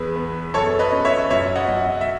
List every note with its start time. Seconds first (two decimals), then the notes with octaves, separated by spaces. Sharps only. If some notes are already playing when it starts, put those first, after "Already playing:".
Already playing: E2 G#4 B4
0.16 B3
0.54 F#2 A4 C#5
0.79 B4 D#5
0.92 C#4
1.05 C#5 E5
1.30 F#2 C#5 E5
1.56 D#5 F#5
1.68 F#2
2.01 E5